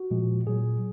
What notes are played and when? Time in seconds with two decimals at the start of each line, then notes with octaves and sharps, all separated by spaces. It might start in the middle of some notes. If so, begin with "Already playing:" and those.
Already playing: F#4
0.11 A#2 F3 G#3
0.47 A#2 F#3 G#4